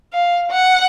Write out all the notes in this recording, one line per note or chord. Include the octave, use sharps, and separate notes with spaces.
F5
F#5